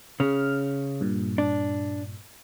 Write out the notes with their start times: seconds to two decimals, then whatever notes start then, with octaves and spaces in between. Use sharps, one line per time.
0.20 C#3 F6
1.01 G2 A#2
1.38 D4